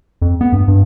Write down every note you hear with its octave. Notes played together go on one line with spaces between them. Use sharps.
F2
B3
G2
G2